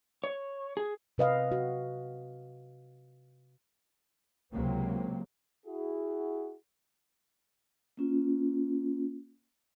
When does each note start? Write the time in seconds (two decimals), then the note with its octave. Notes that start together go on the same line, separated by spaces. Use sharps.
0.24 C#5
0.77 G#4
1.18 C3 B4 D#5 F5
1.51 F#4
4.53 C#2 C3 F#3 A#3 C4
5.66 E4 F#4 G#4
7.97 A#3 C#4 F4